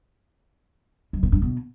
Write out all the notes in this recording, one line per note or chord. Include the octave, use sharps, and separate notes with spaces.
F#2
B2
G2
B2